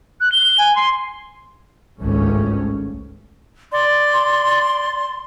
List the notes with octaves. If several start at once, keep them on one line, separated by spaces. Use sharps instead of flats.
F#6
G7
G#5
C6
G#1 C#2 G2 A3 C#4
D5 C6